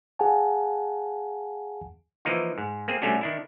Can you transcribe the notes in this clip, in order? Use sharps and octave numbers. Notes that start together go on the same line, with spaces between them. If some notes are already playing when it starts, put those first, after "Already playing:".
G#4 F5 F#5 G#5 A5
E3 F3 A#3 D#4 F4
G#2
A#3 C4 G#4
C3 G3 A3 C#4 D4 F#4
D#3 D4 E4